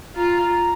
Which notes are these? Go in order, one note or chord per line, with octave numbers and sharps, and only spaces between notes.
F4 A#5